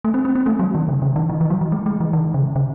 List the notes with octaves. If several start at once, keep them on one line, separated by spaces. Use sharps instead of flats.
A3
C4
C4
C4
A3
F#3
D#3
C#3
C#3
D#3
E3
E3
F#3
E3
G#3
G#3
E3
D#3
C#3
C#3